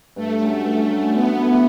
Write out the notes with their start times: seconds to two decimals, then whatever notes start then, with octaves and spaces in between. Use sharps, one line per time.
0.16 G2 A3
0.41 F#3 C#4
0.64 G2 A3
0.89 F#3 C#4
1.13 D3 B3
1.38 A3 E4